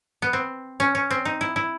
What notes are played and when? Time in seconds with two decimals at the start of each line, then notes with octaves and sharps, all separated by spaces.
0.22 B3
0.33 C4
0.80 C#4
0.95 C#4
1.11 C4
1.25 D#4
1.41 E4
1.56 E4